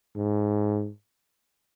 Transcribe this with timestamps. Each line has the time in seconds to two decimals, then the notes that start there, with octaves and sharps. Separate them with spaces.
0.16 G#2